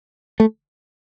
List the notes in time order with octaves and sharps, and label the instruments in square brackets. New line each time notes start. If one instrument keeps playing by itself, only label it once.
[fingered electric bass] A3